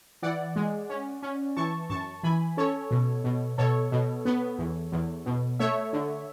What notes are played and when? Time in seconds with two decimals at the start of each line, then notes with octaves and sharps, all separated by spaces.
0.22 E3 D5 F#5
0.56 G#3
0.90 C#4
1.23 C#4
1.56 E3 A5 C#6
1.90 F#2 A5 C#6
2.23 E3 G#5 B5
2.57 C#4 A4 C#5
2.91 B2
3.24 B2
3.58 B2 A4 C#5
3.92 B2
4.25 B3
4.58 E2
4.92 E2
5.26 B2
5.59 A3 C#5 E5
5.93 D3